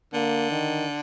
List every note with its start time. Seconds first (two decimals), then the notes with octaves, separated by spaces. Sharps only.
0.13 D3 A#3
0.51 D#3